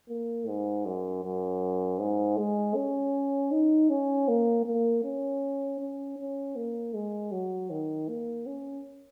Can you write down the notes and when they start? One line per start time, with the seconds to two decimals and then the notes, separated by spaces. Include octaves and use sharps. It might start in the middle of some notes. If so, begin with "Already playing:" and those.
0.09 A#3
0.47 G#2
0.85 F#2
1.24 F#2
1.99 G#2
2.37 G#3
2.76 C#4
3.51 D#4
3.89 C#4
4.28 A#3
4.66 A#3
5.04 C#4
5.80 C#4
6.18 C#4
6.56 A#3
6.94 G#3
7.32 F#3
7.70 D#3
8.08 A#3
8.46 C#4